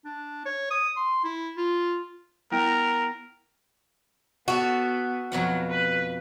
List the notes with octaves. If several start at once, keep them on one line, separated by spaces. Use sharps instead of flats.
D4
C#5
D#6
C6
E4
F4
B3 E4 A#4 G5
B3 F#4 A4 C#5
F2 B2 F#3 F#5
B4